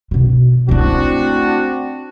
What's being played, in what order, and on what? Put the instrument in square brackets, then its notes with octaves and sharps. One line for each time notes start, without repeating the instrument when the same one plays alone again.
[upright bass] B2 D3
[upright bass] A3 E4 [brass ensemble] C4 D4 F#4